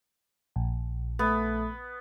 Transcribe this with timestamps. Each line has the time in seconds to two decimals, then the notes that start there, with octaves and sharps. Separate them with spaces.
0.56 A#1
1.19 A3 B3